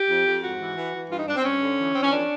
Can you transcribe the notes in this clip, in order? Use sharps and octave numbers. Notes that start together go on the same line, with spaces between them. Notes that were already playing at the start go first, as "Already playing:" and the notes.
Already playing: G4
F2
F2
G#2 F#4
E3
E3
E3
G2 F4
D#4
G2 D4
C4
G2 C#4
D3
E3
E3 C4
C#4
F2 D4